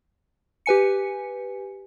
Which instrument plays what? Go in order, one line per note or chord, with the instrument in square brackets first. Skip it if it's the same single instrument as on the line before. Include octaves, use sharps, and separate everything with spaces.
[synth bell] G4 B4 G#5 C#7